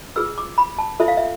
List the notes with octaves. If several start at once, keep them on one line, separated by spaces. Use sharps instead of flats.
F4 G#4 B4 E6
D6
B5
A5
F4 A4 C5 E5
F5
E5